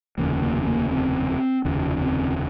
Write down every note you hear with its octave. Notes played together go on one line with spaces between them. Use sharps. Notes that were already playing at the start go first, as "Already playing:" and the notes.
F1 D#2 C#3 A#3
A#3
C4
A#3
C4
F1 D#2 C#3
C4